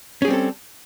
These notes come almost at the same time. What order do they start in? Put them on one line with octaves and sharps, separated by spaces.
C#4 G#4 G3 C4 A4